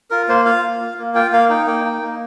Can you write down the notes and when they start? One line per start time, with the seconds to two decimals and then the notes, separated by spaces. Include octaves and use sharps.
0.11 F4 A#4
0.29 A#3 C5
0.45 F4 F5
0.63 A#3
0.81 F4
0.98 A#3
1.15 F4 G5
1.32 A#3 F5
1.49 D#4 G5
1.67 A#3 G5
1.84 D#4
2.01 A#3